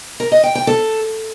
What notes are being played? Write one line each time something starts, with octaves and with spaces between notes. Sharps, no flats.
A#4
D#5
G5
G5
A4